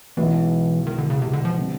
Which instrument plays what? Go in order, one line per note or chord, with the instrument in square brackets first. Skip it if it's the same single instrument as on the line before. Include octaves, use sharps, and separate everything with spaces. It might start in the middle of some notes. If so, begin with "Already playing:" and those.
[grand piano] B1 B2 G#3 B3 E4 [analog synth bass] E3
[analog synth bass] D#3
D3
C#3
C3
D3
F3
[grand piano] D3 G3 C4